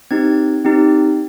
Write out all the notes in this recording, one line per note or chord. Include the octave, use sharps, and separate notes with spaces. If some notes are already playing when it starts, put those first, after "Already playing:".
C4 D#4 G4 G#6
C4 D#4 G4